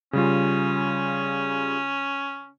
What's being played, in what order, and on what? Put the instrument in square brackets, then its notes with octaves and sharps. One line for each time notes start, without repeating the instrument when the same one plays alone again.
[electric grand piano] C#3 G3 F4 [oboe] C#4